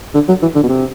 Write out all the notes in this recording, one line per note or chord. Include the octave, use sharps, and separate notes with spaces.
D3
F#3
E3
D3
B2
C3